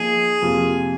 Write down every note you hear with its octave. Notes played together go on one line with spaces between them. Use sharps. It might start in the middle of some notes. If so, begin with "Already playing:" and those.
Already playing: F3 A#3 D#4 G#4
F2 C3 F3 A#3 F4